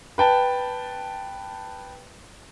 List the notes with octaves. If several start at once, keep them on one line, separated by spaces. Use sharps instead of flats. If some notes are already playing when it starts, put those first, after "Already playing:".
B4 G5 A5